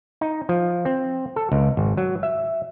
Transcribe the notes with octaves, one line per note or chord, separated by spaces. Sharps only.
D#4
F3
C4
A4
C#2
G#1
F#3
E5